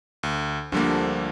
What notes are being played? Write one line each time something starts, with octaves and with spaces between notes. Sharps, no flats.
D2
D2 D3 F3 G3 A#3 D4